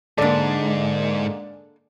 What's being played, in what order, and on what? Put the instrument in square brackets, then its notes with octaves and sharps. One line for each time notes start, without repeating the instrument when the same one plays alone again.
[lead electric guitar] G#2 [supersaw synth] D3 G#3 A#3 [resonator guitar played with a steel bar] D4 A4 [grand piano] D5